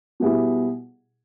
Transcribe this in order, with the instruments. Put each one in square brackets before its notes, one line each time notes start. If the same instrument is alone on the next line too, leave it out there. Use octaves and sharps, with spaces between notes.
[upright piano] B2 G3 B3 E4 G#4